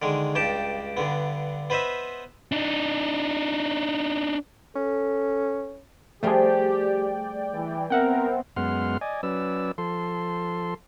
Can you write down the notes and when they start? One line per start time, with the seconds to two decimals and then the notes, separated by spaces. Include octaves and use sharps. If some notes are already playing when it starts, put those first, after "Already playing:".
0.02 D3 D#3 G#3
0.35 C#2 G2 G4 G5 A5
0.97 G2 D3 B3
1.70 B3 B4 C5 D#5 E5
2.52 D4 D#4
4.76 C#4 A4
6.23 F3 G3 A3 F4 G4 G#4 D5 G5
7.53 E3
7.90 B3 C4 A#4 E5 F#5 G5
8.56 F#2 G#3 B3 F#5 C6 F6
9.01 D5 D#5 G#5
9.23 F#3 C#4 B4 D5 E6
9.78 F3 A4 C6